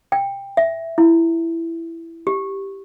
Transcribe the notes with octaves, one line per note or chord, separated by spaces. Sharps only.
G5
E5
E4
G4